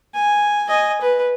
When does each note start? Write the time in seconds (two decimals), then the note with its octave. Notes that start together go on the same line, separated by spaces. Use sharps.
0.14 G#5
0.68 D#5 G#5
1.01 B4